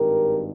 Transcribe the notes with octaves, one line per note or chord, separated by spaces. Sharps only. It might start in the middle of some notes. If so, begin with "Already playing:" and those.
Already playing: G#1 G2 D#3 G4 A#4